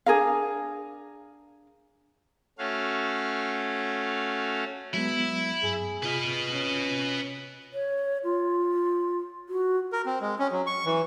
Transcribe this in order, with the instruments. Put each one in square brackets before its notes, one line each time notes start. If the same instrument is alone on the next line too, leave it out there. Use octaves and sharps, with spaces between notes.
[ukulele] D4 G#4 A#4 F5
[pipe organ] A3 C#4 F#4 F5
[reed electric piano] F#3 G#3 B3 [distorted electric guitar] E4
[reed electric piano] G2 [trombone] G#4
[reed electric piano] C3 F4 F6 [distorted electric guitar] B4 D#5
[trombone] C#4
[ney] C#5
F4
F#4
[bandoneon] A#4
C4
G#3
C#4
F#3
C#6
E3